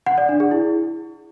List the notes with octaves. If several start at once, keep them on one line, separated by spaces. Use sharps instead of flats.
F#5
D5
D4
G#4
E4